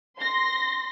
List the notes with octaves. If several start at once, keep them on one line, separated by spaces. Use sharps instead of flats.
C6 A#6